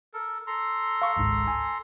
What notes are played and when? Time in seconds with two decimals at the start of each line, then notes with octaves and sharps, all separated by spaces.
0.14 A4 A#4
0.47 A4 A#5 C6
1.02 F5 C#6
1.17 G#1 C#2 G#2
1.47 G#5